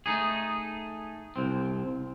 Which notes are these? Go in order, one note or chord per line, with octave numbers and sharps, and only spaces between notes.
A3 D#4 G#4
C2 C4